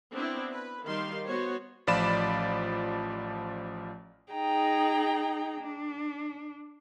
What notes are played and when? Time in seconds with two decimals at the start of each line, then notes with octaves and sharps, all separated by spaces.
0.12 B3 C4 D4 E4
0.52 B4
0.84 D#3 G3 F5 C6
1.25 B3 F#4 C5 C#5
1.87 A1 F3 F4 D5 B5 E7
4.32 D#4 G#4 G5 A#5
5.61 D4